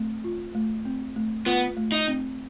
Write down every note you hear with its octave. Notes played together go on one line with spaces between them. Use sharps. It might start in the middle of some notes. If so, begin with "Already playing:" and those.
Already playing: A3 C4
F4
A3
C4
A3
B3 F4
A3
D#4
C4